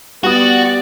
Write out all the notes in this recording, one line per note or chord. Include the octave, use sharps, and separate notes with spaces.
G3 B3 F#4 B4 D5 D#6